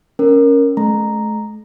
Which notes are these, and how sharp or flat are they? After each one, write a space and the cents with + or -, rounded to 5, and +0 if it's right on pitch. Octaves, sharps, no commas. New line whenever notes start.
C#4 +0 A#4 +0
A3 -40 A#5 +0